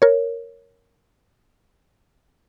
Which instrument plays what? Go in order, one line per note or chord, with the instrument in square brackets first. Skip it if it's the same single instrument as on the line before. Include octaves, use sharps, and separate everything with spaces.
[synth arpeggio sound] A#4 C#5